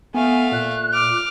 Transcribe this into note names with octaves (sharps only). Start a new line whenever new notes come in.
A3 B3 F5 G#5
A#2 F#6
D6 F6